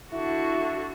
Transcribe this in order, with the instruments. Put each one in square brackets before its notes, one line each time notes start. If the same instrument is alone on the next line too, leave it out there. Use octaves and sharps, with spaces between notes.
[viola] D3 F#4 [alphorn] E4